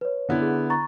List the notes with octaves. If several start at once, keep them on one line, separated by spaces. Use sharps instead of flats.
B4 C#5
D3 B3 E4
G#4
A#5 C#6 A6